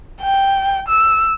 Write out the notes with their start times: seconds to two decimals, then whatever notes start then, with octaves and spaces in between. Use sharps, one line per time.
0.22 G5
0.88 E6